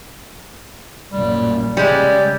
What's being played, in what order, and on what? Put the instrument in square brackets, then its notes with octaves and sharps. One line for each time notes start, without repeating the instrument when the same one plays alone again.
[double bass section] A1 F#2 A#2 [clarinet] G3
[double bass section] C#3 [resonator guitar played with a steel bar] G3 G#3 [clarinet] D5